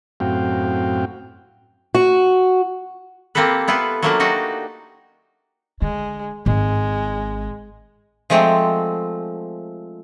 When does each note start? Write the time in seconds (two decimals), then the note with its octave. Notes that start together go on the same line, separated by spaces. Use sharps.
0.20 F#2 A2 C4 F#4 F5 G5
1.95 F#4
3.35 A#3 C4 G4 A4 B4
3.68 B3 E4 F4 A4 B4
4.02 F#3 A3 A#3 D4 E4 F4
4.20 D4 D#4 F#4 G4
5.82 D3 G#3
6.46 G#1 G#3
8.30 F3 G#3 A3 C4